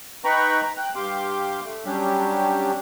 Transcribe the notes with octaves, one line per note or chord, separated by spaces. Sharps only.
D#4 B4 G5 A#5 B5 C#6
A#5
G5 F#6
G2 G4 F5 C6 D6
A3
F#3 G3 C#4 D4 G4